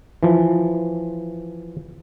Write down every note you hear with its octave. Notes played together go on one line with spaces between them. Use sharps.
E3 F3